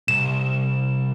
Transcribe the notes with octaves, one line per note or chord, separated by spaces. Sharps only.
C2 E7